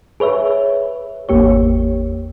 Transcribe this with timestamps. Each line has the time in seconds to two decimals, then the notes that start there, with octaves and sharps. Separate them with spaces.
0.20 G#4 B4 C#5 E5
1.29 G#1 E2 A#3 G4 C#5